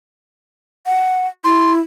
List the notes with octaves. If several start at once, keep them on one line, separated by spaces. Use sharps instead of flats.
F#5
E4 C6